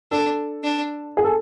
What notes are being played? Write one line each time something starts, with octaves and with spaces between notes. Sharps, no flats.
D4 A4
D4
G#4
A4